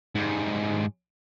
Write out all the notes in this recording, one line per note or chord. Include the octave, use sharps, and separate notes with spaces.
G#2 G3